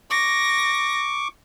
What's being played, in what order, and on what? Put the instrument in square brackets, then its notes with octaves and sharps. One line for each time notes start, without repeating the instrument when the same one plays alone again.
[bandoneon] C#6 D6 [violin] A#6